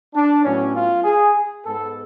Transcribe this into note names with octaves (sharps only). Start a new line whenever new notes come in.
D4
A2 F#3 B3 C#4
F4
G#4
G#2 G#3 B3 A4